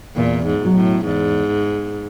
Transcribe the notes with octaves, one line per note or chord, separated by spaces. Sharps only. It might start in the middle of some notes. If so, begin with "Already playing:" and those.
E2 A#2
G#2
B2 F#3
A2
E2 G#2